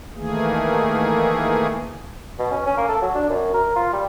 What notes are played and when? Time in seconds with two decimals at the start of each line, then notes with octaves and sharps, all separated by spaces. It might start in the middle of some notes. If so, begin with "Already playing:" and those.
0.15 D#3 E3 A3 A#3 G#4
2.39 B2
2.52 C#4
2.66 C#4
2.77 A#3
2.89 A4
3.02 F#3
3.15 D4
3.30 F#2
3.54 A#4
3.76 F4
3.93 G3